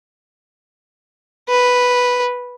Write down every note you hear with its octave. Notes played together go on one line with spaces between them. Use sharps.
B4